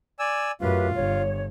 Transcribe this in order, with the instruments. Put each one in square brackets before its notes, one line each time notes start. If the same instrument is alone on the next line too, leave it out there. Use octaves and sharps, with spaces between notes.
[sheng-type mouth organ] D5 G#5 E6
[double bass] F#2 [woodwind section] A3 G4 B4 [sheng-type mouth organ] F4
[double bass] G1 [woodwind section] C#5